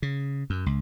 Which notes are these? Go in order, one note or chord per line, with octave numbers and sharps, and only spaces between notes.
C#3
F#2
C#2